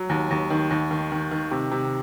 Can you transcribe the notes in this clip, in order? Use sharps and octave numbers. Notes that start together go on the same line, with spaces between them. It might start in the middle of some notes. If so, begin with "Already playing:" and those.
Already playing: F#3
D#2
D#2
D#3
D#2
D#3
D#3
D#3
C3
C3